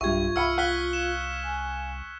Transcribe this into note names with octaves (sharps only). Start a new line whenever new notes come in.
B1 G2 F4 G4 E5 C#6 G#6
C2 E5 F5 B5 E6 F6 C#7
F5 F#6 B6 G7
E7
G#5